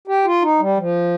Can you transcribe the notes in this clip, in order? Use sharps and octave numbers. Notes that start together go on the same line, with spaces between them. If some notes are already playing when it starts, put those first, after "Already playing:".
G4
F4
D#4
G3
F3